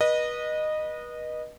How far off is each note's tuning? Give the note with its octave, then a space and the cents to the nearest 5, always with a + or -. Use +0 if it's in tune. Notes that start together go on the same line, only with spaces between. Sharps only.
B4 -30 D#5 -15